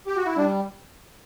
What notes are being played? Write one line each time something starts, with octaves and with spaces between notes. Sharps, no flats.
G4
F#4
E4
G3 D4